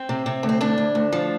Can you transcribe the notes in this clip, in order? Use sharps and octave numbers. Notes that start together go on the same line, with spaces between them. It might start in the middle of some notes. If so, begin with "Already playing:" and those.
Already playing: C4
C3
C3
D2
C4
D2 D4
D2
D2
F3